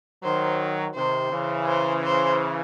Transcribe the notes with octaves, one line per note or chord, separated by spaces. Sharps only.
D#3 F#3 C5
C3 D#3 C5
C#3 E3
C5
C5